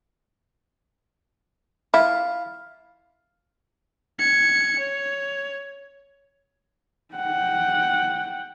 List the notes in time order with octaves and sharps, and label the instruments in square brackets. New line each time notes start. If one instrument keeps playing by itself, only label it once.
[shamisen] E4 [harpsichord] F4
[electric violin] G#6 C#7
C#5
[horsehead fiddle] F#5 G5